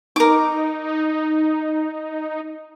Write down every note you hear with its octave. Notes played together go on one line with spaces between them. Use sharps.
D#4 A#4 D6